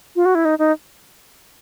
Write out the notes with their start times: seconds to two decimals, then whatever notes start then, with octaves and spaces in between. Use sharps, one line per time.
0.16 F4
0.25 F#4
0.35 E4
0.45 D#4
0.59 D#4